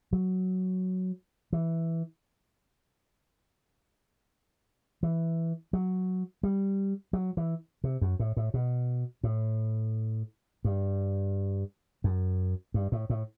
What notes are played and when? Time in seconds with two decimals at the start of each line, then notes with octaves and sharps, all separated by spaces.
0.13 F#3
1.53 E3
5.03 E3
5.73 F#3
6.43 G3
7.13 F#3
7.37 E3
7.84 C3
8.01 F#2
8.20 A2
8.37 A2
8.54 B2
9.24 A2
10.65 G2
12.04 F#2
12.74 G2
12.92 A2
13.10 A2